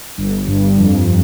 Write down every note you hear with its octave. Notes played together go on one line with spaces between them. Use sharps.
G1
G2
F2